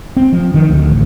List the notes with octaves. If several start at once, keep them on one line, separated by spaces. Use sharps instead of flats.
C4
F3
D#3
D2
A1